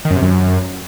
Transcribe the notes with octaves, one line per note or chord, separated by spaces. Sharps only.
D#3
F#2
C3
F#2